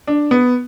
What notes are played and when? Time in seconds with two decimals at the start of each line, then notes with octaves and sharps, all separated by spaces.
0.08 D4
0.31 B3